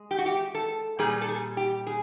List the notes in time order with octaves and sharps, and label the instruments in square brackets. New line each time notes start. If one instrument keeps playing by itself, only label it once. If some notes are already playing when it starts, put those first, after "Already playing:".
Already playing: [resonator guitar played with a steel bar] G#3
G4
F#4
G4
A4
A#2 G3 G#4
A4
G#4
G4
G#4